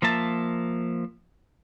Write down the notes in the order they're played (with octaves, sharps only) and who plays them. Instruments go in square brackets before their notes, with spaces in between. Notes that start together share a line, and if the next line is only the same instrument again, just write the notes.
[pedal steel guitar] F3 A#3 E5 A5